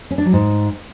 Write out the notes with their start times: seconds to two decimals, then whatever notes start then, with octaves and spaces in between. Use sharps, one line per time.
0.11 C#4
0.18 D4
0.26 F#3
0.33 G#2